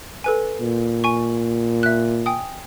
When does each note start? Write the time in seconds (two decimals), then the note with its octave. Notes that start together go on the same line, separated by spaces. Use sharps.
0.24 A4 B4 G#5
0.61 A#2
1.04 G#5 C#6
1.83 E5 F#6
2.26 G5 G#5 D#6